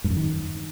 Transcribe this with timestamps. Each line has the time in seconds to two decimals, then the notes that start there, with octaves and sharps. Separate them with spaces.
0.04 G2
0.10 F#2
0.17 D#3